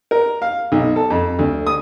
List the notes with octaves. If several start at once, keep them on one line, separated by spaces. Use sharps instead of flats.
A#4
F5
B1
A4
F2
D2
D#6